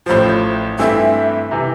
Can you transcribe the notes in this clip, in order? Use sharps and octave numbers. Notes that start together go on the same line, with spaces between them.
A1 A2 F3 C5
G2 E3 A3 C4 E4 E5
C3 E3